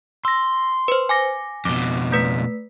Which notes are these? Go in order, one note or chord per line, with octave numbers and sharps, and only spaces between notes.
C6 E6 A#6
B4 C5
G#5 D6 A#6
F2 B2 D6
A3 B4 B6